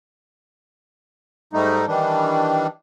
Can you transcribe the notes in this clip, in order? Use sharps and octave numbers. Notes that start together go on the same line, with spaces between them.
G#2 G3 A3 D#4
D#3 E3 G3 D4